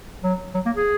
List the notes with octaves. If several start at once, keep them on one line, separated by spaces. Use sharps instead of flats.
F#3
F#3
A#3
G#4